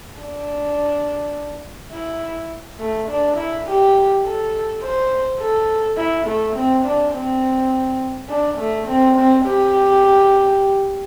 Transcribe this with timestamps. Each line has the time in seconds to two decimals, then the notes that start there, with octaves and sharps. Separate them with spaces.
0.19 D4
1.92 E4
2.79 A3
3.09 D4
3.37 E4
3.66 G4
4.24 A4
4.82 C5
5.40 A4
5.97 E4
6.27 A3
6.56 C4
6.85 D4
7.14 C4
8.29 D4
8.58 A3
8.87 C4
9.16 C4
9.45 G4